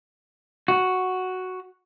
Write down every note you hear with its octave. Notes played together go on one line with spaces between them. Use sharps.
F#4